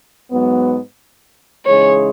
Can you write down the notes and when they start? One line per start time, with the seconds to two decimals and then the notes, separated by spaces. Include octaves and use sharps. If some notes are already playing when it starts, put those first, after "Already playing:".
0.30 G#2 F#3 B3
1.66 C#3 E3 G#3 D#4 G#4 C#5